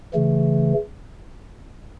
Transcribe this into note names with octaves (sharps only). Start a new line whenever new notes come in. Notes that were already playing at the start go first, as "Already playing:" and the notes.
C#3 E3 A3